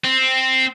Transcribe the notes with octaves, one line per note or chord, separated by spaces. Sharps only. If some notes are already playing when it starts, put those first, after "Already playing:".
C4